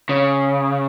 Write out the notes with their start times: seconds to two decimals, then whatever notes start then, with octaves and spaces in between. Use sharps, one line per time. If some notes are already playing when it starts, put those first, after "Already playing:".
0.09 C#3